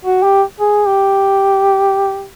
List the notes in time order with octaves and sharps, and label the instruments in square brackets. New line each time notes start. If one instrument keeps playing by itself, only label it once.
[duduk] F#4
G4
G#4
G4